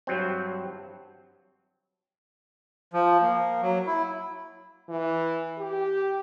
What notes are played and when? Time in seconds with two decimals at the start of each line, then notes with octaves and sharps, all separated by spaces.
0.07 G2 F#3 C4
2.93 F3
3.22 A#3
3.62 F#3
3.87 E4
4.89 E3
5.58 G4